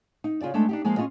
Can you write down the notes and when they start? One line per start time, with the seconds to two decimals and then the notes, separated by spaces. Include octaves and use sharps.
0.24 D#4
0.41 C#3 F4 G#4 D5
0.54 G#3 A3 C4 D4 A4
0.69 D4 D#4 G4
0.85 F3 G#3 A#3 G#4
0.97 C#4 D#4 F4 G#4 D#5